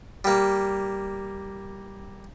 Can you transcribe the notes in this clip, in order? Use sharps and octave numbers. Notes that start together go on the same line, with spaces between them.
G3 A#3